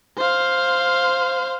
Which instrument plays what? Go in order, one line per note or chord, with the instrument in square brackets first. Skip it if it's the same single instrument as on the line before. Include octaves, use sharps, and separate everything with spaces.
[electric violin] C5 F5